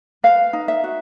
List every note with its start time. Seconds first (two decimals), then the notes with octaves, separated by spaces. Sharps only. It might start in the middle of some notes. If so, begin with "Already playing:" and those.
0.24 B4 F5
0.53 D#4
0.68 E5
0.84 F#4